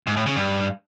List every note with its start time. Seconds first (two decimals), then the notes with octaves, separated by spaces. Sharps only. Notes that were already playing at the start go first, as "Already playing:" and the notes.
0.07 G#2
0.16 A2
0.26 C#3
0.36 G2